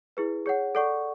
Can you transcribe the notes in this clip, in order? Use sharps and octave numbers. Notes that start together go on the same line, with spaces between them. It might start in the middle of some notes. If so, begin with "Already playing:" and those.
E4 G#4 B4
G#4 C#5 F#5
A4 D5 F#5 C#6